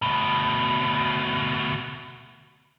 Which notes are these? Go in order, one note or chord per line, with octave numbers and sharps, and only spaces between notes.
D2 B2